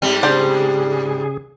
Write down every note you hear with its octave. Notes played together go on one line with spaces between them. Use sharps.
G#2 G3 C4
C#3 D4 G4 G#4 C5